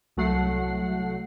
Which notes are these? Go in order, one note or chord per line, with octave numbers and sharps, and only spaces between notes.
C2 F#3 A3 F#5 C7